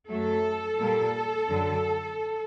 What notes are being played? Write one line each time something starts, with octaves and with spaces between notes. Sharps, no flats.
F#2 F#3 A3 A4
A#2 G3 A#3
F#2 D3 F#3